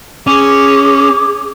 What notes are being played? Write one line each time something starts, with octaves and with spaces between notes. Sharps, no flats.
C#4 G#4 D6